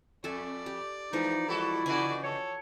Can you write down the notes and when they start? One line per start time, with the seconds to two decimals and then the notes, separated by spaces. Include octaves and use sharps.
0.24 F2 A4 D5 E5 G#5
0.66 G4
1.13 E3 F3 G#3 D#4 F4
1.48 G3 E4 F#4 A4
1.86 C#3 F#4 B4 D5 D#5 G#5
2.24 A4 C#5